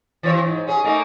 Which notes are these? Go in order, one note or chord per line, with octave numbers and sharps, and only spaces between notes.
E3 C4 C#5
G#2
C#4 G#4
A3 A#3 D#4